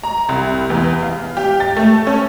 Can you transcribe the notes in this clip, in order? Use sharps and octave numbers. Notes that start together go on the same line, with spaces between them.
A#5
C2
E2
F5
G4
A6
A3
C#4